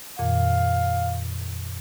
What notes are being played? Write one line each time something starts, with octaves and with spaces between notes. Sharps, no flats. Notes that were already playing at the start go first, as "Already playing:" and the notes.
F2 A#2 D#3 F5